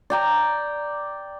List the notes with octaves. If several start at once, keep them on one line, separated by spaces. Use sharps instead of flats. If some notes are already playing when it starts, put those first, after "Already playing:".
D5 G5 A#5